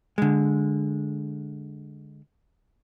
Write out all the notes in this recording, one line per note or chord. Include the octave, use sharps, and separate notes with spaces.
D3 G#3